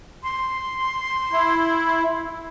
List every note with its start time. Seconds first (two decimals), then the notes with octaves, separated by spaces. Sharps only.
0.23 C6
1.32 E4